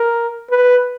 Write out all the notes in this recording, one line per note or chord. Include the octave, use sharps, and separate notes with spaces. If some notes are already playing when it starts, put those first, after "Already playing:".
Already playing: A#4
B4